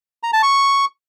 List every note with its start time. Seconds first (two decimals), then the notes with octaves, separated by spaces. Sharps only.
0.23 A#5
0.33 A5
0.43 C#6